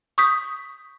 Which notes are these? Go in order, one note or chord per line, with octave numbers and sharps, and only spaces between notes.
C#6 D#6 G6 B6